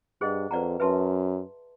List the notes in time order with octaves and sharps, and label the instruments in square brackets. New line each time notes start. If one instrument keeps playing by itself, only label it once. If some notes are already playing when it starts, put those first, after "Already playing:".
[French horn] G2 [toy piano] G#4 C5 D#5 F#5
[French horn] F2 [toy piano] B4 D5 F#5 A#5
[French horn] F#2 [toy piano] B4 E5 A5 C6